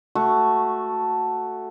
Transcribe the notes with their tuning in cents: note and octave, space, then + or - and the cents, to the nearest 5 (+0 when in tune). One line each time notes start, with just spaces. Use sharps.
A3 +0 F#4 +0